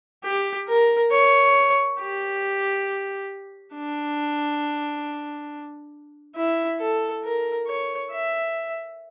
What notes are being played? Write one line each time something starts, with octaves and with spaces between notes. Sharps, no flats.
G4
A#4
C#5
G4
D4
E4
A4
A#4
C#5
E5